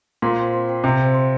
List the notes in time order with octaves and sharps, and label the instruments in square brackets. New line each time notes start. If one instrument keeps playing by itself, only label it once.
[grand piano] A#2 [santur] C5
[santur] C4
C4
C4
[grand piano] C3 [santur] C4
[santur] C4
C5